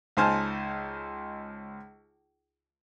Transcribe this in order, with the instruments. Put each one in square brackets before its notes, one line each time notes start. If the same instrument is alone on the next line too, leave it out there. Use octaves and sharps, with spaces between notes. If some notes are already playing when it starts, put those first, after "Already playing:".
[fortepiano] C#2 D#4 C5 G#5 A5 F6